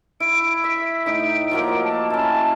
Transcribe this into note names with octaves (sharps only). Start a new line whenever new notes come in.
E4 D7
E5 B6
A2 D#4 D7
F3 F#3 A#3
A5
C#4 E4 A5